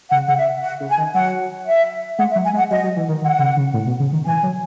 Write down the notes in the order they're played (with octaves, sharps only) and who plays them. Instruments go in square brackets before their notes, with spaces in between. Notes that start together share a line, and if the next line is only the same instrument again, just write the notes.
[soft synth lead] C#3 [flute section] F#5
[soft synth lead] C#3 [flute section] F#5
[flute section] E5
F#5
[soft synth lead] C#3
[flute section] G#5
[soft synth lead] D#3
[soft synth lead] F#3 [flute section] F#5
[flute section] E5
[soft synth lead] G#3 [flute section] F#5
[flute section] E5
[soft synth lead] F#3
[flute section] G#5
[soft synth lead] G#3
[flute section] F#5
[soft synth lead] F#3 [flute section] D#5
[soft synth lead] F#3
E3
D#3
[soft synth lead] D#3 [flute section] F#5
[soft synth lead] C#3
C#3
A2
B2
C#3
D#3
[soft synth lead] E3 [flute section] G#5
[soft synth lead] F#3